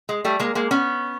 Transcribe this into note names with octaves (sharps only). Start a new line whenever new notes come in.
G#3
G3 A3
G#3 A#3
G#3 A#3
B3 C#4